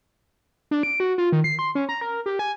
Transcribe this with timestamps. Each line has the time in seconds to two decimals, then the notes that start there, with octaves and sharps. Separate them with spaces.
0.71 D4
0.83 D7
1.00 F#4
1.18 F4
1.32 D#3
1.44 C7
1.59 C6
1.75 C#4
1.89 A#5
2.01 A#4
2.26 G4
2.39 G#5